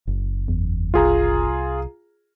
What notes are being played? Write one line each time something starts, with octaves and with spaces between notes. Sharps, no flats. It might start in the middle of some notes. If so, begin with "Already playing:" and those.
F#1
E2
C2 F4 G#4 A#5